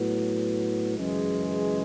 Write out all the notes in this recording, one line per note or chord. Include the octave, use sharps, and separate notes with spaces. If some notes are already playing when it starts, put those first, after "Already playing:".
Already playing: A2 F#3 B3
F#2 C#3 E3 G#3